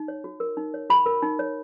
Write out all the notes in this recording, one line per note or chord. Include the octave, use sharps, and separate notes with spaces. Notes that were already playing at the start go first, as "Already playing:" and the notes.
Already playing: D#4
C#5
F#4
A#4
D#4
C#5
F#4 B5
A#4
D#4
C#5